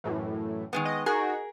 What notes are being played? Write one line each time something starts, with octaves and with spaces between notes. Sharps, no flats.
F#2 A2 E3
D#3 G#3 B3
D#5
D#4 F#4 G#4 A#4